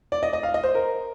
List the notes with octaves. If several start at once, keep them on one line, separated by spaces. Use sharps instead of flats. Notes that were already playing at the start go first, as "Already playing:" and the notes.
D5
D#5
D#5
F5
D#5
C5
A#4